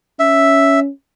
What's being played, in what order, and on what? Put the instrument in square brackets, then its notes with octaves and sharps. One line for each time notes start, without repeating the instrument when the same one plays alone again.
[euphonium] C#4 [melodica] E5